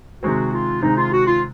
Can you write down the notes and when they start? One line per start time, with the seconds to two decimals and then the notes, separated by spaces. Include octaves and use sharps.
0.23 C3 D#3 G#3 C4 F#4
0.53 F4
0.82 C3 D#3 G#3 C4 D#4
0.97 F4
1.12 F#4
1.27 F4